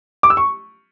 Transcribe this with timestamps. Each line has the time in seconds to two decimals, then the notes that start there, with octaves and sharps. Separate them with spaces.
0.23 D6
0.30 E6
0.37 C#6